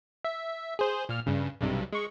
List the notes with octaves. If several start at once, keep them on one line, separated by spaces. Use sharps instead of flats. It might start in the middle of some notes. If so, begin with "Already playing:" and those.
E5
G#4 C5
A#2 F6
G2 C#3
B1 G2 C3
G#3 C#6